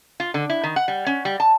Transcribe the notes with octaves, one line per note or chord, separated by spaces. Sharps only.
F4
D3
E4
D#3
F#5
G3
C#4
G3
A5